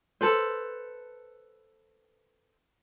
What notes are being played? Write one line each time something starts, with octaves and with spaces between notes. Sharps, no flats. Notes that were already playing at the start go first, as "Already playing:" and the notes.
A4 B4 C5